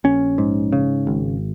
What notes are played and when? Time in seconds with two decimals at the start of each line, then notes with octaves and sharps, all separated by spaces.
0.04 A#1 C#4
0.38 G#2
0.72 C#3
1.07 G#1